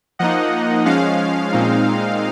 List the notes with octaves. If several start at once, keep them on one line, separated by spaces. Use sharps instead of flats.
F3 A#3 D#4 D#5 F#5
F3 G#3 C#4 F5
A#2 G#3 C4 D#4